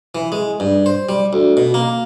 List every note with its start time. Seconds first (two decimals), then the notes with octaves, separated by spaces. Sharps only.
0.15 E3
0.32 G#3
0.60 G2
0.86 C5
1.09 G3
1.33 D2
1.57 B2
1.74 A#3